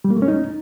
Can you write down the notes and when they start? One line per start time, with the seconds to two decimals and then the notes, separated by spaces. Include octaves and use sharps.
0.05 G3
0.10 A#3
0.16 A3
0.22 C#4
0.28 D#4